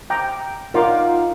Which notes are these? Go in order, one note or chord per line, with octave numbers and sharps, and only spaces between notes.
G5 A#5 D6
D#4 F4 A#4 F#5 C6 D6